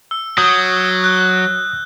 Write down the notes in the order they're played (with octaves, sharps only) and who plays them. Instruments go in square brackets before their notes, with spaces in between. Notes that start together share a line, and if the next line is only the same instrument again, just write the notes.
[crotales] E6
[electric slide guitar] F#3 [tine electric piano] D#6 [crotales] G6
[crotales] F#6